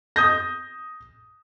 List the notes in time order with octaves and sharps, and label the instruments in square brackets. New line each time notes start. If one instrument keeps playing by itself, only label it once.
[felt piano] D#6 G6 A#6